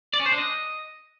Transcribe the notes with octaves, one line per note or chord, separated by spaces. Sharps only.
D5
C#4
C5
D4
D#5